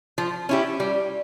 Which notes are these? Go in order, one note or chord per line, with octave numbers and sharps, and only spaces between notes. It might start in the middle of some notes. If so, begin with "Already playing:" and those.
F3
C#4 E4 G4
G3